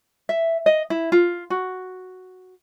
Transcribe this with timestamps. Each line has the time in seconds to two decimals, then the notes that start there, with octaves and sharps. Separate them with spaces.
0.29 E5
0.66 D#5
0.90 E4
1.12 F4
1.50 F#4